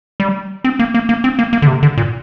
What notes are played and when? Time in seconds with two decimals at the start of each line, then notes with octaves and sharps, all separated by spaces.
0.20 G3
0.64 C4
0.79 A#3
0.94 A#3
1.09 A#3
1.24 C4
1.39 A#3
1.53 A#3
1.62 D3
1.68 C3
1.83 D3
1.98 A#2